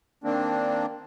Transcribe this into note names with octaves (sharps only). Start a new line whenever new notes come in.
D#3 A#3 C4 D4